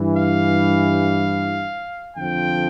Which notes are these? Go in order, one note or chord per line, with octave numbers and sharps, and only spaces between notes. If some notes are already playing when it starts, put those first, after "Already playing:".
Already playing: G2 E3
F5
F2 D3 F3 G5